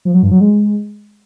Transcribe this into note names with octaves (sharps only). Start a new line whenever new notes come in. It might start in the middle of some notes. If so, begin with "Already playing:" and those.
F3
F#3
G2
F#3
G#3